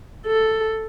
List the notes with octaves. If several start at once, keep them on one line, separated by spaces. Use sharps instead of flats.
A4